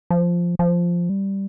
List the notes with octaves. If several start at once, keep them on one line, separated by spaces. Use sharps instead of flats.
F3
F3
G3